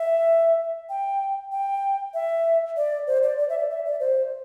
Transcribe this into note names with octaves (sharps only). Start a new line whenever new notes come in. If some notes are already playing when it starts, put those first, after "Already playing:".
Already playing: E5
G5
G5
E5
D5
C5
D5
D5
E5
D5
E5
D5
C5